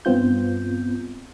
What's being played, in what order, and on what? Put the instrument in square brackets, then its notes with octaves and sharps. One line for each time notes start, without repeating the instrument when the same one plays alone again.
[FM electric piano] G2 B3 C4 F4 G6